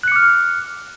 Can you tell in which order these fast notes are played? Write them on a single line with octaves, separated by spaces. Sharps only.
F#6 C#7 D6 F6